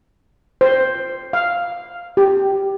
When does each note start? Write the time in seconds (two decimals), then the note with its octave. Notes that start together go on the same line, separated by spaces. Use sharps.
0.61 C5
1.33 F5
2.17 G4